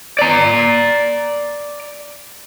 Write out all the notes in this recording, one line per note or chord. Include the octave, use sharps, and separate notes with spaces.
D5 A#5